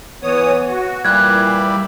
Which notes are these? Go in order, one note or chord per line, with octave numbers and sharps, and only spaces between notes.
E3 B3 C#5 D#6
F#4
A#2 E3 G3 A#3 E4 F#6 G#6